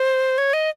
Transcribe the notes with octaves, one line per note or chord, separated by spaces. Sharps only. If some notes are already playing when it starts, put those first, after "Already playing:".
Already playing: C5
C#5
D#5